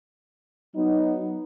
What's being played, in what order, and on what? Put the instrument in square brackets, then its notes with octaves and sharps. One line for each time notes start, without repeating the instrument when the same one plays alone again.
[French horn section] F#3 B3 D#4